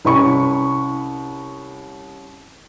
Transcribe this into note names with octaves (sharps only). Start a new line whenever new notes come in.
C2 C#4 B5 C#6